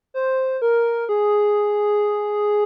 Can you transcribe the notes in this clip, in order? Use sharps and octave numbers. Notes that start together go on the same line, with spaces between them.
C5
A#4
G#4